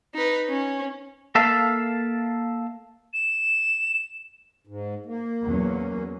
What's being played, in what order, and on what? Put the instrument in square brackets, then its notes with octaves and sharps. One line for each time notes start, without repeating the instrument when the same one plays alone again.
[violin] D#4 B4
C#4
[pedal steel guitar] A#3 A4 E5 F5 A5
[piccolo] E7
[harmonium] G#2
A#3
[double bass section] E2 F#3 C#4